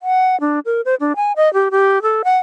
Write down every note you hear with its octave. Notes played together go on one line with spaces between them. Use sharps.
F#5
D4
A#4
C5
D4
G#5
D#5
G4
G4
A4
F#5